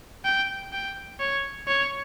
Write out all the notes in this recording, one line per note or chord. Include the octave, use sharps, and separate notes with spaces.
G5
G5
C#5
C#5